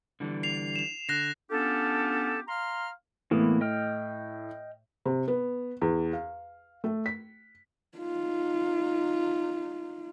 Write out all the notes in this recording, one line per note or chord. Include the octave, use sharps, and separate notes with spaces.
D3 E3 G3
C7 F7
E7 F7
D3 F#6 A#6 C7
B3 C#4 D4 F4 G4 A4
F5 A#5 C6 F6
A2 E3 A#3 B3
D#5 G5 F6
C3
B3
E2
F5
A3
B6
D#4 F4